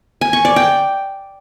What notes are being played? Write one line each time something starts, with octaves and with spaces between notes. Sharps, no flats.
G#5
C#6
D5
G5